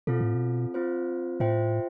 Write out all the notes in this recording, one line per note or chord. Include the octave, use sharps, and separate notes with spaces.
B2 C4 F4 A4
A2
B2
C4 F4 C5
A2 F4 C5 E5 G5